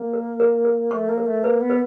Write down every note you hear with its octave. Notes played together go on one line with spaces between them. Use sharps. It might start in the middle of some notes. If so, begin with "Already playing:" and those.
Already playing: A#3
A#4
A#4
A#4
A3 C#6
A#3
A#4
A3
A#3 B4
B3
B4